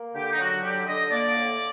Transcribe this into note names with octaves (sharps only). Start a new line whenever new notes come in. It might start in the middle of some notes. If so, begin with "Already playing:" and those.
Already playing: A#3
D3 G4
D#4
F#3 F#4
D3 G4
D3 D#5
A#3 D5
A2